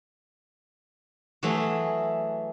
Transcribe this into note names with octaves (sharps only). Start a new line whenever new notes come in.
E3 F#3 A3 G#4 E5